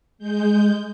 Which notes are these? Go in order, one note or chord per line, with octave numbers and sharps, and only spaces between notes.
G#3 G6